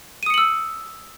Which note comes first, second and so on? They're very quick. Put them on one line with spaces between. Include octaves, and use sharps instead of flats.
D#7 D#6 C#7 F#7 E6